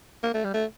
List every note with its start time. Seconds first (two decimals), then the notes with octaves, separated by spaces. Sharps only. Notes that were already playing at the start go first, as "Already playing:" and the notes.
0.23 A#3
0.34 A3
0.44 G3
0.54 A3